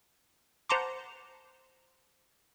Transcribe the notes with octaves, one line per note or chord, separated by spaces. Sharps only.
C5 F#5 A5 A#5 C6 D6